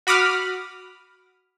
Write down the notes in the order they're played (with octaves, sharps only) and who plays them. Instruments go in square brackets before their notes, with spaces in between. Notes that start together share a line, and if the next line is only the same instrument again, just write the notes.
[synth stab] F#4 B5 D6 D#6 F6